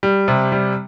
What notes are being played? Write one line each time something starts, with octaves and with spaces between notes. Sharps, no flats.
G3
C3
G3